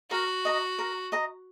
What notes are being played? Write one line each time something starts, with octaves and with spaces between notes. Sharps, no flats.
F#4 A#4
D#5 A#5
A#4
D#5 A#5